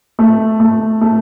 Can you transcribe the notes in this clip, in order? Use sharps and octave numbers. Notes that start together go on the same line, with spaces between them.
A3
A3
A3